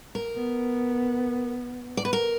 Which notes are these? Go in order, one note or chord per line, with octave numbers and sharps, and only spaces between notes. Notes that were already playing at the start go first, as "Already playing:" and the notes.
A#4
B3
D5
B4
A#4